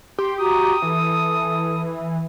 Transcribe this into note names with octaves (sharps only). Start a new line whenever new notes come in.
G4 C6
F#4 A#5 D6 D#6
E3 A4